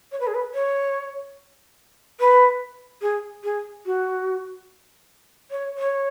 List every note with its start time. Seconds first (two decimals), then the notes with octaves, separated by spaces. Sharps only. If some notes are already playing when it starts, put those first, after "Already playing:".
0.12 C#5
0.20 B4
0.27 G#4
0.34 B4
0.54 C#5
2.20 B4
3.02 G#4
3.44 G#4
3.86 F#4
5.51 C#5
5.78 C#5